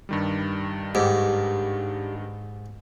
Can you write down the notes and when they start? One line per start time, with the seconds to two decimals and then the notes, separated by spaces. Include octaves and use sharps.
0.09 G2 D#3 G3
0.95 G#2 G4